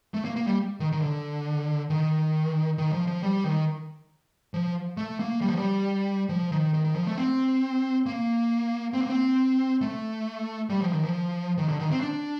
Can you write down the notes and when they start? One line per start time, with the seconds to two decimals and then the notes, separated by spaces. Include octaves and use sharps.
0.14 A3
0.25 A#3
0.36 A#3
0.47 G3
0.80 D#3
0.92 D#3
1.02 D3
1.90 D#3
2.78 D#3
2.92 F3
3.07 F3
3.22 G3
3.44 D#3
4.54 F3
4.97 A3
5.19 A#3
5.41 G3
5.49 F3
5.56 G3
6.29 F3
6.52 D#3
6.74 D#3
6.85 D#3
6.95 F3
7.07 A3
7.18 C4
8.06 A#3
8.94 C4
9.01 A#3
9.09 C4
9.81 A3
10.70 G3
10.81 F3
10.93 D#3
11.04 F3
11.58 D#3
11.68 D3
11.79 D#3
11.91 C4
12.01 D4